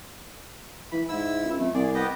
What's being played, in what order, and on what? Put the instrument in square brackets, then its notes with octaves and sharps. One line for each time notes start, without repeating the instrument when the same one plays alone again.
[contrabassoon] E3 [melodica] B5
[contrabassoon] G#2 [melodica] E4 E6
[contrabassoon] C#2
[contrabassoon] F2 [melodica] A3
[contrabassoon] C2 [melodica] G#4 D5
[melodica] B3 G4 D#5